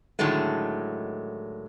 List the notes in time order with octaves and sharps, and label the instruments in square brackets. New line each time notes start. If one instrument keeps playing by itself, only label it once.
[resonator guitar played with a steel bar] A2 D3 D#3 F#3 G#3 A3